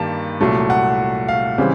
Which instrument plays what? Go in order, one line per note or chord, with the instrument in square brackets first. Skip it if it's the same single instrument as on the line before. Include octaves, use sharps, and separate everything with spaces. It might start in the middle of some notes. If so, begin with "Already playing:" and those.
Already playing: [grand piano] G2 D#3 G3 A#3 A5
C2 A#2 F#3 A3
F#5
F5
C#3 E3 G3 C4